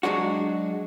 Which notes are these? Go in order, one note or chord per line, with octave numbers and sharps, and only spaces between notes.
F#3 G#3 D4 F#4